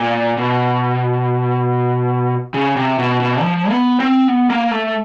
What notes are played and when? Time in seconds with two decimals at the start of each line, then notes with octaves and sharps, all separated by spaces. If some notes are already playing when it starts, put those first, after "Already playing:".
Already playing: A#2
0.37 B2
2.54 C#3
2.76 C3
2.99 B2
3.20 B2
3.42 F3
3.70 B3
4.00 C4
4.28 B3
4.50 A#3
4.71 A3